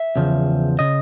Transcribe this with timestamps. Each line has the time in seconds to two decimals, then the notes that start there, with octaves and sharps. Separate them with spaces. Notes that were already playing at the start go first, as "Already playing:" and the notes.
Already playing: E5
0.16 E2 C#3 F3
0.79 C#3 D#5